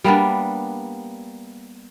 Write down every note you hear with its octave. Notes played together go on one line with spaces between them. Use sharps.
G3 A#3 B3 D4